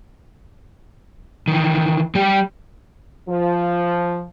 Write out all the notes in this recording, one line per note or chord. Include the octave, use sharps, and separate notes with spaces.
D#3 E3
G3 G4
F3